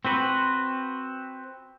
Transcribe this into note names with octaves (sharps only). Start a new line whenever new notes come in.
C4 F#4 B4